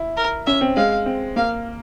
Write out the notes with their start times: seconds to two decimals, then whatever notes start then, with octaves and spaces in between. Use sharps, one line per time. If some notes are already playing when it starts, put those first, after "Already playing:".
Already playing: E4
0.17 A#4
0.47 C#4 E5
0.61 C4
0.76 G#3 F5
1.06 C4
1.36 A#3 F5